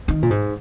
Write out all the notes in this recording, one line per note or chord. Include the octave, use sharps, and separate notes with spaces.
D#3
A#2
G#2